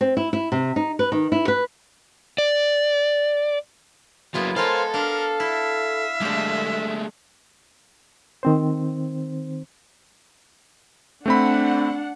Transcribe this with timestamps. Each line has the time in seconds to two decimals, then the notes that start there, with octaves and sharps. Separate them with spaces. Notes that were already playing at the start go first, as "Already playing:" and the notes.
0.01 C4
0.17 E4
0.33 E4
0.52 C3
0.76 D#4
0.99 B4
1.12 D#3
1.32 E4
1.48 B4
2.38 D5
4.34 F#3 A#3 B3 E4 F4
4.56 G#3 F4 A4 A#4 C5 C#5 F5
4.94 D4 A#4 F5
5.40 E4 E5
6.21 D3 G#3 A3 G4
8.43 D#3 C4 C5
11.26 A3 C4 D4 F#5 B5